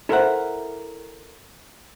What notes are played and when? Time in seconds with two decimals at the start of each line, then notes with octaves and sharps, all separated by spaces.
0.09 E4 A4 A#4 C5 E5 F#5